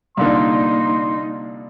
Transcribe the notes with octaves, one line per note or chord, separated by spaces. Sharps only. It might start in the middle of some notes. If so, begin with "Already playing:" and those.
C2 A#2 D3 A#3 D#4 C6